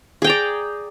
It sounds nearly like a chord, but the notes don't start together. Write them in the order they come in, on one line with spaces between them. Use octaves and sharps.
G#4 G5 A#5 D5